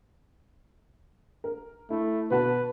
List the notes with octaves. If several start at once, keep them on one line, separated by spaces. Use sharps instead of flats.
A#4
A3 E4
B2 B4 F#5 A5